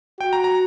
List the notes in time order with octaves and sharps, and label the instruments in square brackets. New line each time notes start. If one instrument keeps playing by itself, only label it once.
[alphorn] F#4 [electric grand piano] G5
[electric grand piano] A#5
A#5